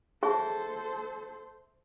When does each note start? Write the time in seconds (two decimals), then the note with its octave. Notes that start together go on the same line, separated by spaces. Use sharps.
0.23 G#4 A4 C5 E5 A5 C#6